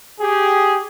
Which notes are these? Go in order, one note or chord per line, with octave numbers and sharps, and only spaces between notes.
G4 G#4